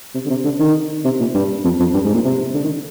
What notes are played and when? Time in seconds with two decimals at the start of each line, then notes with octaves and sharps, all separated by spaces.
0.14 C3
0.26 D3
0.30 C3
0.44 D3
0.60 D#3
1.05 C3
1.20 A#2
1.35 G2
1.65 F2
1.80 F2
1.94 G2
2.05 G#2
2.15 A#2
2.25 C3
2.54 D3
2.64 D#3